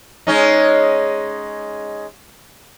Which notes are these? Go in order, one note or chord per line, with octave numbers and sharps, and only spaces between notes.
G#3 C#4 D#4